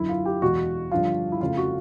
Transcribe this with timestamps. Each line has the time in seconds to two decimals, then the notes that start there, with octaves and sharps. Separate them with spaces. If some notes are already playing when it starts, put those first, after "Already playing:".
Already playing: F#2 D3 F#3 E4
0.09 F4
0.26 G4
0.42 E2 B2 G#3 F#4
0.91 G2 D3 F3 F4
1.32 E4
1.41 F2 C#3 F3 A3 F4
1.57 F#4